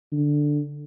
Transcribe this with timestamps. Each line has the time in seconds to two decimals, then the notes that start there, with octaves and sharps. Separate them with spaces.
0.12 D3